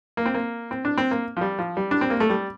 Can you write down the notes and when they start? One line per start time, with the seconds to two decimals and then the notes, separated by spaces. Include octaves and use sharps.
0.17 A#3
0.26 C4
0.34 A#3
0.71 C4
0.85 D4
0.98 C4
1.11 A#3
1.37 F3
1.41 G3
1.59 F3
1.77 G3
1.91 D4
2.01 C4
2.10 A#3
2.20 A3
2.30 G3